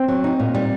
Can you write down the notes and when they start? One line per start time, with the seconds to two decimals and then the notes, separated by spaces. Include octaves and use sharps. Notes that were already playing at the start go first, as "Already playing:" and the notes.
Already playing: C4
0.08 F#3
0.24 D#4
0.39 A#2
0.55 G3